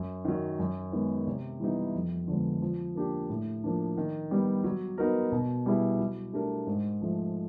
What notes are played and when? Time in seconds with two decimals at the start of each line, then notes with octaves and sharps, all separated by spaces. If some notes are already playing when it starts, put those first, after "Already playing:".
Already playing: F#2
0.25 D#3 F#3
0.59 F#2
0.92 D#3 G#3 B3
1.27 C3
1.60 E3 G3 B3 D#4
1.94 F2
2.28 D3 F3 G#3 B3
2.62 F3
2.95 A#3 D4 G4
3.30 A2
3.64 F3 A#3 D4
3.98 D#3
4.31 G3 B3
4.64 F#3
4.98 B3 D#4 F#4 A#4
5.32 B2
5.66 G3 B3 E4 G#4
5.99 F#3
6.33 A3 D4 G4 A#4
6.67 G#2
7.02 F3 A3